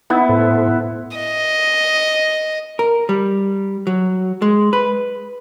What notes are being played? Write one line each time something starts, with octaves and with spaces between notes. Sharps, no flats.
B3 D#4 E4
A2 A4 C5
D#5
A#4
G3
F#3
G#3
B4